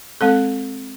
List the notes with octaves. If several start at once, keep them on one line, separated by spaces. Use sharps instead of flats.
G#3 C4 A4